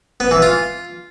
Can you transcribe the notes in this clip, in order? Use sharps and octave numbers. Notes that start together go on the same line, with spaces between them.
B3
E3
F4